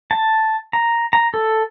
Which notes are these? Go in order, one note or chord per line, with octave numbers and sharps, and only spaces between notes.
A5
A#5
A#5
A4